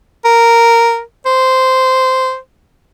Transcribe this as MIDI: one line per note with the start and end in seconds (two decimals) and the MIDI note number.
0.25 1.01 70
1.26 2.37 72